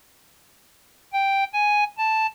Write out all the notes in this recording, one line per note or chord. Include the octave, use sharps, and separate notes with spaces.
G5
G#5
A5